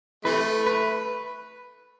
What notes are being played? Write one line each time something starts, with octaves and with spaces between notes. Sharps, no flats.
C3 E3 A3 B4
B4